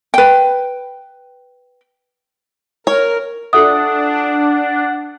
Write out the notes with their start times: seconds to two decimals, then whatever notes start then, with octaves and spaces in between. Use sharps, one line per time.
0.14 B4 G5
2.87 A#4 C#5
3.53 D4 F4 A4 E5 F#5 D#6